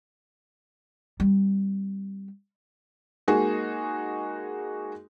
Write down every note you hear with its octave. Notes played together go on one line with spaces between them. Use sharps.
G3 C4
G#3 A#3 D#4 F#4 G#4